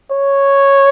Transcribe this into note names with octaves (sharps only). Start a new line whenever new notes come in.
C#5